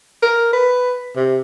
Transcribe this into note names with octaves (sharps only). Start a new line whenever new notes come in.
A#4
B4
C3